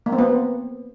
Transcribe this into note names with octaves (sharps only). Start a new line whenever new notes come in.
A#3
C4
B3